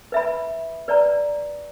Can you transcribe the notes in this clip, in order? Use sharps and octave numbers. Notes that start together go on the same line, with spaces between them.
B4 E5 B5
B4 D5 A#5